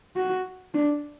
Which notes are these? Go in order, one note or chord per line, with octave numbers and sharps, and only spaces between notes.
F#4
D4